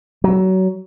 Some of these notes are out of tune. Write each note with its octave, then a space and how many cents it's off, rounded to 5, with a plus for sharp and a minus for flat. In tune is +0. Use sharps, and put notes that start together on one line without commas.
F#3 +25